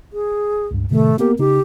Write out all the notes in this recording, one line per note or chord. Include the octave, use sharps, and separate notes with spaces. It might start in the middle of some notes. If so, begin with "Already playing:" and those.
G#4
C#2 G2
A2 C3 D#3 A3
A#3 B3 G4 A#4
C#3 D#4 G4